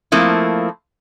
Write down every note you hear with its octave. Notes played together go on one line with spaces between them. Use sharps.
F3 A3 A#3 C4 E4